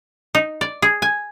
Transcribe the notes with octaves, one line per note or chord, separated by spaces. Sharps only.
D#4
D5
G#4
G#5